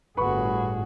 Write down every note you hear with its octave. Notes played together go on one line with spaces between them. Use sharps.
G1 A2 F#4 G#4 B4 B5 C#6